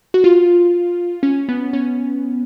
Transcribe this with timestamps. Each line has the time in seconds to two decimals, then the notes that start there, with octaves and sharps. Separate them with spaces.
0.14 F#4
0.24 F4
1.23 C#4
1.49 B3
1.73 C#4